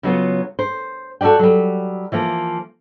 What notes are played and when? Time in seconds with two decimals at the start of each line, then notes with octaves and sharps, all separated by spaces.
0.03 C#3 F#3 B3 F4
0.59 C5
1.21 F#4 A4 B4 D5 G5
1.39 F#3 G3
2.12 E3 F3 A#3